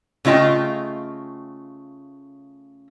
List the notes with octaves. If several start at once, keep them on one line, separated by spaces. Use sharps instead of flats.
C#3 A3 F4 D#5 G5